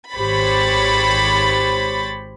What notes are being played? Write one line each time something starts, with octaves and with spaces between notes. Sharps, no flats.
G#1 G4 C5 C#5 B5 A6